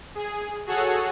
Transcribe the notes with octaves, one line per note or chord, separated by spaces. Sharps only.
G#4
F#4 G#4 A4 C#5 F#5